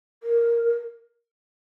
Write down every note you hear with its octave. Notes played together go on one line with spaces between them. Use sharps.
A#4